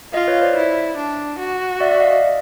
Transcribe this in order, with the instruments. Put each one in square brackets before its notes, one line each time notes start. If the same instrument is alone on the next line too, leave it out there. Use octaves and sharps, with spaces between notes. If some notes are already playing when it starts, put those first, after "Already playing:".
[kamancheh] F4 [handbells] D#5 F5
[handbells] B4 C#5
C5 D5
[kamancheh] E4
D4
F#4
[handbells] D5 E5
D5 E5
D#5 F5
D#5 F5